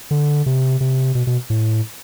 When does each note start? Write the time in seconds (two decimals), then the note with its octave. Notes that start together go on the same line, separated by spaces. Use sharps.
0.11 D3
0.46 C3
0.80 C3
1.15 B2
1.27 B2
1.50 A2